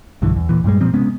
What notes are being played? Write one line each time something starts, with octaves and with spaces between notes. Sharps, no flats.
B1 G2 D3 E3
E2
A#2 E3
G2 A#2 G3 G#3
A#2 F3 C4
C3 G#3 B3 C#4